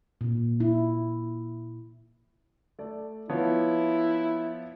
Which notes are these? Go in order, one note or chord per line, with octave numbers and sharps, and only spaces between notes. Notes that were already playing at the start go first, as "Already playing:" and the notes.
A#2
E4
A3 D5
F3 B3 E4 C#5